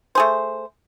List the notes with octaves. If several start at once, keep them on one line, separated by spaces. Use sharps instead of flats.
A3 G#4 C5